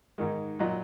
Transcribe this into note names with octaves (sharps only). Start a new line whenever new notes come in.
G#2 D#3 G#3 A#4
A#2 F#3 D#5